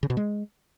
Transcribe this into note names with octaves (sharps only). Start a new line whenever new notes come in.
C#3
B2
G#3